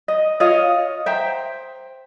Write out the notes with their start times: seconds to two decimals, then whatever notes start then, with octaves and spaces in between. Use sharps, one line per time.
0.08 D#5
0.40 F4 C#5 D#5 F5
1.06 C5 E5 G5 A#5